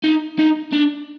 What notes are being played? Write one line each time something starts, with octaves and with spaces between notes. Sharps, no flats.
D#4
D#4
D4